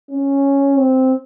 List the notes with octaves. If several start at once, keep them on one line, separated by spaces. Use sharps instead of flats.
C#4
C4